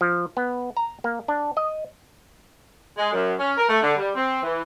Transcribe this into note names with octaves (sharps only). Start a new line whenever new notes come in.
F3
B3
A#5
A#3
D4
D#5
G#3
F#2
C#4
A#4
A3
D3
G3
C4
E3